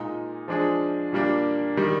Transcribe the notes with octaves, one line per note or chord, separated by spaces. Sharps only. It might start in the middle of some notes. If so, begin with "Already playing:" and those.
Already playing: A#2 G#3 D#4
F3 G#3 D4 G#4
A#2 G3 A#3 D4
D#3 G3